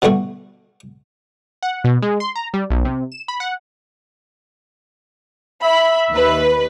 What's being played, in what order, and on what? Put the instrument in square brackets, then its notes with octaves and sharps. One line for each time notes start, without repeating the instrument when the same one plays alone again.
[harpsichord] B2 D3 G3 A3 F#4
[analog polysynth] F#5
B2
G#3
C6
A#5
G3
B1
C3
E7
B5
F#5
[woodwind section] E5 [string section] B5
[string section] D#2 B4